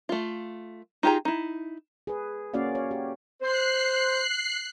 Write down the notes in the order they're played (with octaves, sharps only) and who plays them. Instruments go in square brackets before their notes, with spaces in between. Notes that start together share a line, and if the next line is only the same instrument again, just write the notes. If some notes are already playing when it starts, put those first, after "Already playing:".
[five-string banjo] A3 F4
D#4 F4 G4 G#4 A#5
D#4 E4
[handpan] G#4 B4
A#3 C#4 F#4 D5 F5
C#5
G4
[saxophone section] C5 [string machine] F#6 C7